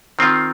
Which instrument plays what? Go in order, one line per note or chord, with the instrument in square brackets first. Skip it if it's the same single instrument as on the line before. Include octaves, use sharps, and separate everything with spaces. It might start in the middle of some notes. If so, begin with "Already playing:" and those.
[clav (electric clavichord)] D#3 C4 F4